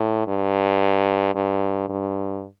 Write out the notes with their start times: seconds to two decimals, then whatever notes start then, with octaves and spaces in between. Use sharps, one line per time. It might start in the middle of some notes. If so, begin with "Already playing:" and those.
Already playing: A2
0.27 G2
1.35 G2
1.89 G2